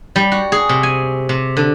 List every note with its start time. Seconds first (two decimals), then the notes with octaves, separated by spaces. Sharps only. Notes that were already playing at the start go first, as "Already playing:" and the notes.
0.16 G3
0.32 F#4
0.52 G#4
0.69 C3
0.83 G#5
1.29 C3
1.57 D3